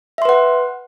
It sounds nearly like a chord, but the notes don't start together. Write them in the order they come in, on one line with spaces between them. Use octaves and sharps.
E5 C6 B4 F#5